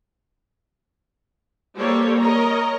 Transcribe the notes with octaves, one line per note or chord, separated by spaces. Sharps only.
G3 A#3 G4 A4 C5 C#5
A#4 C#5 D#5 A#5